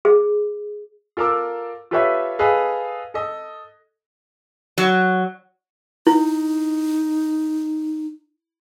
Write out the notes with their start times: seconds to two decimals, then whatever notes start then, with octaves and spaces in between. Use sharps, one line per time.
0.05 G#4
1.17 F4 A4 A#4 A#5 D6 E6
1.91 F4 G4 A4 B4 C#5 E5
2.39 G#4 A4 B4 D#5 F5
3.14 A4 D#5
4.78 F#3
6.07 D#4 E4